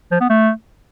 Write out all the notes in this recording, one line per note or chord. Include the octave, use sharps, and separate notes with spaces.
F3
B3
A3